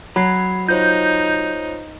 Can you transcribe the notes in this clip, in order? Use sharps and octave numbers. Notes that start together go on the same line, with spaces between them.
F#3 B5 G#6 C7
D#4 F4 C5 C#5 G6